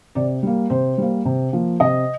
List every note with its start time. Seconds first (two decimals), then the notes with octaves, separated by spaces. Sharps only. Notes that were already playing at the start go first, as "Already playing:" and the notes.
0.15 C3 D5
0.43 G3 A#3
0.70 C3 C5
0.98 G3 A#3
1.25 C3
1.53 F3 A#3
1.80 C3 D#5